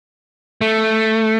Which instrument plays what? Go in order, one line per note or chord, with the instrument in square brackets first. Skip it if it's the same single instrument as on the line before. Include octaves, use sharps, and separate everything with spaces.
[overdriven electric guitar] A3